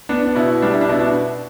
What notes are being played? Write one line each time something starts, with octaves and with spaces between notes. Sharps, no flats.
B3 D4
D4
B2 E4
G3 D4
E4
D4
B2 E4
D4